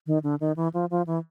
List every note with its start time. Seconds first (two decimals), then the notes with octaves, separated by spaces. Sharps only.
0.07 D#3
0.24 D3
0.40 D#3
0.56 E3
0.74 F3
0.91 F3
1.07 E3